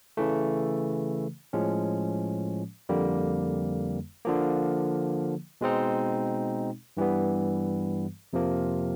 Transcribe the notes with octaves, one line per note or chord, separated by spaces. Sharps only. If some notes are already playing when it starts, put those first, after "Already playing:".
C#3 E3 A3
A2 F3 G#3 C#4
F2 D3 G3 A#3
D3 F3 A#3
B2 G#3 C4 D#4
G2 E3 G3 B3
F2 C3 F3 A#3